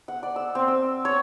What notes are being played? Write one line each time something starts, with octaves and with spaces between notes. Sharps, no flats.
F#5
D5
E6
C4
E6
C#5